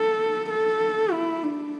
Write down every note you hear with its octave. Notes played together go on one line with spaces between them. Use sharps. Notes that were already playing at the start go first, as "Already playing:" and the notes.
Already playing: A4
A4
E4
D4